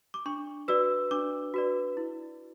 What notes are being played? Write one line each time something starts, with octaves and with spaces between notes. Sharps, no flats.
D6
D4 C#6
F#4 B4 D5 E6
D4 D6
F#4 B4 D5
E4